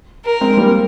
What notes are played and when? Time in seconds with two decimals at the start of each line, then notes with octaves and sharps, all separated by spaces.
0.25 A#4
0.41 G#3 C4
0.57 G3 A#3